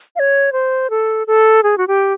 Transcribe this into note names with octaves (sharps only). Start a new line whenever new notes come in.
F5
C#5
C5
A4
A4
G#4
F#4
G4